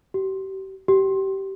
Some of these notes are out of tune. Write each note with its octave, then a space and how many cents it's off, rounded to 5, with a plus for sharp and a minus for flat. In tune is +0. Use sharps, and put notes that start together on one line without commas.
G4 -35
G4 -25